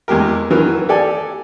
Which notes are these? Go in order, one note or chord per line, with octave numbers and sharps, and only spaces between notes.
E2 G#3 G4 A#4
D#3 E3 F#3 A#4
G4 A4 D5 G#5